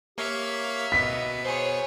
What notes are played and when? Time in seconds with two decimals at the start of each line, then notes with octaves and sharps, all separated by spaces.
0.18 A#3 G4 C#5 E5 F5
0.92 B2 B3 D#5 B6
1.44 G#4 C5 C#5